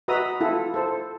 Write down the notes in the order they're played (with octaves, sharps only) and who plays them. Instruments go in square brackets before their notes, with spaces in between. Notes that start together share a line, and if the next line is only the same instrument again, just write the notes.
[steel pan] F#4 B4 D#5 E5 A#5 D#6
E4 F4 A4
A4 C5